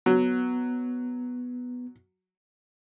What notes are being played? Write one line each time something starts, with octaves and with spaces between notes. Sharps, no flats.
F#3 B3